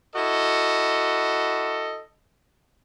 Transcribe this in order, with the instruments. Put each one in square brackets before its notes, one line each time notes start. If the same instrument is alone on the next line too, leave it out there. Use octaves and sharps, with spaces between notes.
[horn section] E4 F#4 A4 D#5